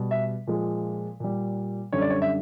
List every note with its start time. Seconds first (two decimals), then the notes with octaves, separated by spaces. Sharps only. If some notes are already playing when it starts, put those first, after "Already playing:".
Already playing: B2 G3
0.11 E5
0.47 A#2 F3 G#3
1.20 A#2 G3
1.92 F#2 D3 G3 C#5
2.02 D5
2.10 C#5
2.22 E5